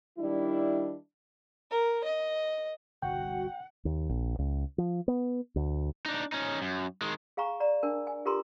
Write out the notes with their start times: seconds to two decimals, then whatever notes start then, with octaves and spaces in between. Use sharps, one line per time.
0.18 D#3 G3 D4 E4
1.71 A#4
2.04 D#5
3.02 G1 C2 B2 F#4 F#5 G5
3.85 D#2
4.09 A#1
4.39 C#2
4.78 F3
5.08 B3
5.56 D2
6.06 D4 D#4
6.32 C#4 D#4
6.62 F#2
7.01 D#3 G#3
7.37 G#4 F5 G#5 A#5 C#6
7.60 D5 A#5
7.83 D4 A#4 A5
8.07 G#5
8.25 F4 G4 A4 A#4 A#5 C6